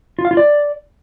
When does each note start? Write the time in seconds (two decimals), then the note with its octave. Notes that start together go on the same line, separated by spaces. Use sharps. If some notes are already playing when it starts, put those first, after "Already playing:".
0.19 F4
0.25 F5
0.31 F4
0.37 D5